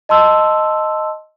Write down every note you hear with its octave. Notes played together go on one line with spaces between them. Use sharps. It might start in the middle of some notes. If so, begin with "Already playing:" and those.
D#5 A5 C6 E6